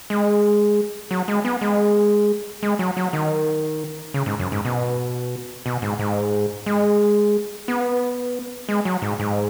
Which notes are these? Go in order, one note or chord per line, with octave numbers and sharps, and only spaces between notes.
G#3
F#3
G#3
B3
G#3
G#3
F#3
F#3
D#3
C#3
G#2
F#2
G#2
B2
B2
G#2
G#2
G#3
B3
G#3
F#3
G#2
G#2